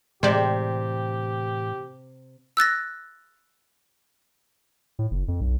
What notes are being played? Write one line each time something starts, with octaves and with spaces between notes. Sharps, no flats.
A2 C3 E3 G#3 G4 C5 D5
E6 F#6 A6 A#6
A2
F#1
F2
B1